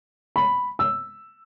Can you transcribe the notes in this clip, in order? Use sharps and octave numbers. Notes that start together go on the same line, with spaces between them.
B5
E6